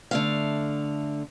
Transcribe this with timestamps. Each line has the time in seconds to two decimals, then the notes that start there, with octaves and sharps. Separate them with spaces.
0.11 D3 A3 F5